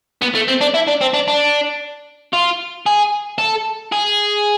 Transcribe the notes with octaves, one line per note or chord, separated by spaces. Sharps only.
B3
A3
C4
D4
E4
D4
C4
D4
D4
F4
G#4
A4
G#4